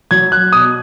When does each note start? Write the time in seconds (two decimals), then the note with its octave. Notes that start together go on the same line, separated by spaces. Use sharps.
0.11 F#3 G#6
0.32 F#6
0.52 B2 D#6